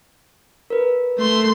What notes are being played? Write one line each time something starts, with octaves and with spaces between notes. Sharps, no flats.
A#4 B4
A3 C6